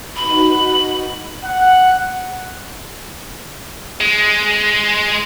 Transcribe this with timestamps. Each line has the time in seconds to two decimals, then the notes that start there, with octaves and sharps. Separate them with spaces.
0.16 D#4 F#4 B4 B5
1.42 F#5
4.01 G#3